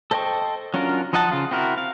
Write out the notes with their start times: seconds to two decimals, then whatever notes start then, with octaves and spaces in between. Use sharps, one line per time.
0.11 A4 C5 D#5 G5 C#6
0.74 F#3 C#4 D4 F4 A#4
1.13 F3 D#4 D#5 F#5 A5
1.31 C#3 F4
1.51 C4 E4 F#4 A#4
1.78 F5